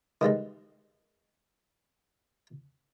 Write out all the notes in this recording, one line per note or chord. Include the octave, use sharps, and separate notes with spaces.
D#3 E3 G3 G#3